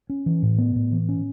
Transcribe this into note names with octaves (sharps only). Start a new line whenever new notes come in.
C#4
E3
A2
B3
A2
E3
C#4